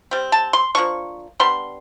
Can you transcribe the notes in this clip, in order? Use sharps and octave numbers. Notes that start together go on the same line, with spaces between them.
G3 C4
A5
C6
F3 A#3 D4 C#6
G3 B3 D4 C6